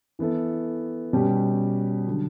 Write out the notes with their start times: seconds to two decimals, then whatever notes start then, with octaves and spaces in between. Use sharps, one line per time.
0.19 E3 B3 E4 A4
1.13 B2 G3 C#4 G4
2.08 D3 F#3